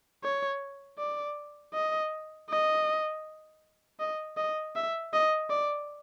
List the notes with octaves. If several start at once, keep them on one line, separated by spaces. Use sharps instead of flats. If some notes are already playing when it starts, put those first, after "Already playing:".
C#5
D5
D#5
D#5
D#5
D#5
E5
D#5
D5